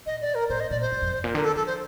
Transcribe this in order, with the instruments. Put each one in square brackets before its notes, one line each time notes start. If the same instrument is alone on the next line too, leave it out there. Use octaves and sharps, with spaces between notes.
[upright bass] A#2 [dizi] D#5
[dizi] D5
A#4
[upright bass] A2 [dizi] C5
[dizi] D#5
[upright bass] A#2 [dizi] D5
[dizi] C5
[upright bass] G2
F2
G2
A#2
[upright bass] D3 [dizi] A#4
[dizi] A4
[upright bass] F3 [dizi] A4
[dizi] C5